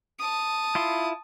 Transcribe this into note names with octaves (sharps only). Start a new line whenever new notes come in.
A5 D#6
E4 F4 C6